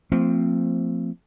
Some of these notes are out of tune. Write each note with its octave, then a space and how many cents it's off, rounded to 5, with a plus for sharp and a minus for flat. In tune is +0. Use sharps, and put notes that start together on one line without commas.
F3 +0 A3 +45 C4 +0